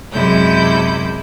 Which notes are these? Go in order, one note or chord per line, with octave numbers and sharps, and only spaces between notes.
F#2 C3 G#3 E4 G6